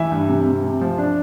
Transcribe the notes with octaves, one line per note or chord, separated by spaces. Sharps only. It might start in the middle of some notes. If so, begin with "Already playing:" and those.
Already playing: E3 E5
G2
C3
C3
C3
F3
D4